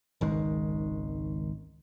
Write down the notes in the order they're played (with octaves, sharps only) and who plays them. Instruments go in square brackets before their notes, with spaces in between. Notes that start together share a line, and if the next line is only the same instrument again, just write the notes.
[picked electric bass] G#1 C#2 D#3 G#3